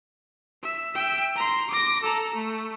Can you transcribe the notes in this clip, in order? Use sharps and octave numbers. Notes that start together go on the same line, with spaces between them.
E5
E5 G5
A#5 C6
D6 A#6
A4 A#5
A3